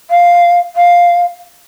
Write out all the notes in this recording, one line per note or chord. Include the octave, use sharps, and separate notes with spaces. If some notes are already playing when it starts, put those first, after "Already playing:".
F5
F5